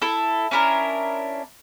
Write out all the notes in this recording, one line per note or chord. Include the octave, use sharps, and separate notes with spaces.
E4 A4
C#4 D4 E4 A#4